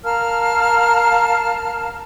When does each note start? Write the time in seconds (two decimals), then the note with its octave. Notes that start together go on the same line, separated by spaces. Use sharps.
0.04 A#4 F5 A5 F6